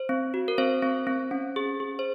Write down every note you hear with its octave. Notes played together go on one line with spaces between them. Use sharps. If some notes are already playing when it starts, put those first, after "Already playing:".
Already playing: C5
C4
F#4
A#4
C4 C5
C4
C4
C#4
G#4
G#4
C5